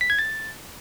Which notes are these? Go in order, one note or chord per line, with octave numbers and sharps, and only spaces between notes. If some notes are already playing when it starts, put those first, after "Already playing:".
B6
G#6
A6